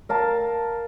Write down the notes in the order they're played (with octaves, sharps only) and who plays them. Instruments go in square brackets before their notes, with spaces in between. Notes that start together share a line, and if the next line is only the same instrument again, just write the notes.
[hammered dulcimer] A#4 F5 A5